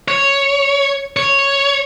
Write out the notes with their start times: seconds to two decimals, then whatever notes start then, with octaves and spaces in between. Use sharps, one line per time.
0.08 C#5
1.17 C#5